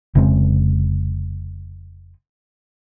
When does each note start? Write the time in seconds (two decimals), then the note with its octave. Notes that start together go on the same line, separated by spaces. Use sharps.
0.15 F1 C#3 G#3 C4